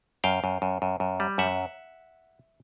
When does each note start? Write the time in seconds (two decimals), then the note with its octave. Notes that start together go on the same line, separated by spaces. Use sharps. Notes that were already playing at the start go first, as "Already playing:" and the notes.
0.24 F#2 F5 G5
0.44 F#2
0.62 F#2
0.82 F#2
1.00 F#2
1.20 G3
1.38 F#2 E5 F#5